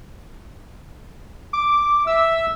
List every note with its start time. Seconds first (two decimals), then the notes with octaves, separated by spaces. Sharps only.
1.53 D6
2.07 E5 E6